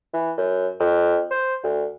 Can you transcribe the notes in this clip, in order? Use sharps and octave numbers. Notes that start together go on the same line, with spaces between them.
E3
F#2
F2
C5
D2